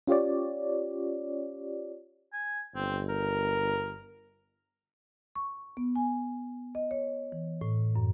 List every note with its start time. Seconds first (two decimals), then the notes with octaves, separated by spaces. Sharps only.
0.07 C#4 F4 G4 C#5 D5
2.33 G#5
2.75 G1 C4
3.09 A#4
5.35 C#6
5.77 B3
5.96 G#5
6.75 D#5
6.91 C#5
7.32 E3
7.61 A2
7.96 F#2